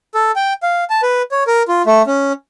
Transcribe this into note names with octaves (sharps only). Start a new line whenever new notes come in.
A4
G5
F5
A5
B4
C#5
A#4
F4
A3
C#4